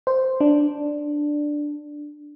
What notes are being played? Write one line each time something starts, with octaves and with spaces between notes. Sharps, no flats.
C5
D4